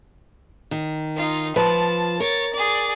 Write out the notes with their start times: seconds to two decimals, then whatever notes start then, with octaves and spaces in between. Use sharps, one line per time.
0.71 D#3
1.16 D#4 F4
1.56 F3 B4 A5
2.20 A#4 C#5 A6
2.54 G#4 D5